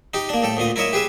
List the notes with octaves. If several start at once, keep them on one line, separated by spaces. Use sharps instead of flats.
D#4 G4
A#3 D4
A2 A4 G5
D2 A#2 F4 D#6
E4 A#4 C#5 D#5 E5
G4 G#4 B4 E5